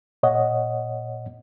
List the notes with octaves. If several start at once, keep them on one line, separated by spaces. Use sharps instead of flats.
A#2 C#5 D#5 F#5